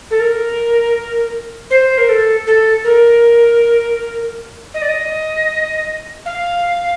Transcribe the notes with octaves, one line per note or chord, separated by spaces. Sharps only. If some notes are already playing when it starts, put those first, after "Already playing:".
A4
A#4
C5
A#4
A4
A4
A#4
D#5
D5
D#5
F5